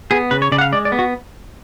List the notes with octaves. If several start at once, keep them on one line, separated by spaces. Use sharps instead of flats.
B3 G#4
C#3 B4
C#5
C#3 D5
F#5
F5
G#3 D5
D5
B3
F#4